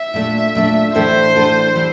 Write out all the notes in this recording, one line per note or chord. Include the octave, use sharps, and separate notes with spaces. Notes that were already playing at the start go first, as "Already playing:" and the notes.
Already playing: E5
A#2 A3 D4
A#2 A3 D4
A2 E3 A3 D4 A4 C5
A2 E3 A3 D4 A4
E3 G3